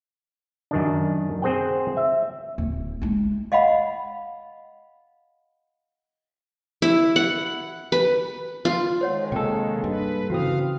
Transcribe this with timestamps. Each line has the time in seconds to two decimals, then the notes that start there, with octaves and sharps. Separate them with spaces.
0.71 F#2 D#3 D4
1.42 C4 G#4 C5 F#5 G5
1.97 E5
2.58 D1
3.02 G#3 D#4
3.52 D#5 F5 F#5 B5
6.82 E4
7.16 F#5
7.92 B4
8.65 F4
9.01 D#3 G#3 C5 C#5 F#5
9.32 C3 A#3 A4 G5
9.84 G2 B4
10.30 G1 C#3 E3 C4 F#4 F5 D#6